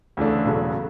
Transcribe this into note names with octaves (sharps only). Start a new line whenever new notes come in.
D2 C#3 E3 A3 D4
E1 E2 C#3 F#3 A3